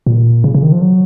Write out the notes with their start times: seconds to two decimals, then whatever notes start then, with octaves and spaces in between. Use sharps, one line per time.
0.06 A#2
0.44 C#3
0.54 C#3
0.63 D#3
0.72 F3
0.81 F#3